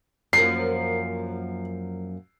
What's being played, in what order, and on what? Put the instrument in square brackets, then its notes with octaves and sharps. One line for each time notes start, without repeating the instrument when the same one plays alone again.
[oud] F#2 F3 A#3 [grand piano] C7